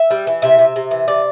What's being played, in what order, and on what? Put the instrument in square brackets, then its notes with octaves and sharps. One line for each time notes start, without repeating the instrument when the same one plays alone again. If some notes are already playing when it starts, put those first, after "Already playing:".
Already playing: [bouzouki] E5
G3
E3
C3 E5
C3
C3
E3
C3 D5